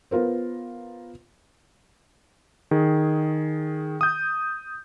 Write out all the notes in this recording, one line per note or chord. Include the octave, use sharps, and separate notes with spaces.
B3 F4 A#4 C5
D#3 G#4
D#6 G6